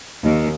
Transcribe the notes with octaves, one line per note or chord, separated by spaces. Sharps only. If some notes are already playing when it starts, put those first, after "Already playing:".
D#2